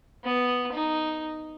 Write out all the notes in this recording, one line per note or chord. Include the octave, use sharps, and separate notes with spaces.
B3
D#4